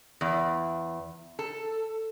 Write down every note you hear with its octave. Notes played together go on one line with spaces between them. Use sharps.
E2
A4